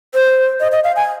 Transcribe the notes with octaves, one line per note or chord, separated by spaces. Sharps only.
C5
D#5
D#5
F5
G#5